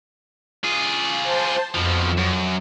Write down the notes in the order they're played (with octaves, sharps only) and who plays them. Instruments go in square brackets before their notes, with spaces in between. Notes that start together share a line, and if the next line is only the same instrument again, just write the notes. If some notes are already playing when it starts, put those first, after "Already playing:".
[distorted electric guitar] F4 G#4
[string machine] C5 A5 G6
[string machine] F2 [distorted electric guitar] B2 F3
[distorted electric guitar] F#2